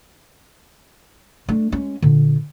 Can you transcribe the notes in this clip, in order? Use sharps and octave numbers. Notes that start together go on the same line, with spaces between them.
A3 D4
G#3 C#4
A#2 D3